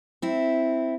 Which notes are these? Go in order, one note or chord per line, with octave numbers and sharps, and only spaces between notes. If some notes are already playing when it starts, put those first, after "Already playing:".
C4 E4